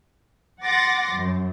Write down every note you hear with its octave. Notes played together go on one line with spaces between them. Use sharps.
F#5 C6 D6 A6 A#6
F#2